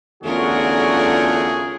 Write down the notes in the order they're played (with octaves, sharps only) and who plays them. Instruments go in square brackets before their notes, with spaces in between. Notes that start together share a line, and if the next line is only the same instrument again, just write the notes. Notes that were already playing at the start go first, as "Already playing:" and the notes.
[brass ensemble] E2 A3 F#4 [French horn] D3 [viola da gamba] C#4 F4 A#4 [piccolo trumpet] G#4